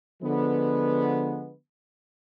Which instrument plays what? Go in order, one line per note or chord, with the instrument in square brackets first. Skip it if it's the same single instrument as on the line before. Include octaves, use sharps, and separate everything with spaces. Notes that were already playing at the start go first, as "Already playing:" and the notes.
[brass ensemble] D3 F3 G#3 B3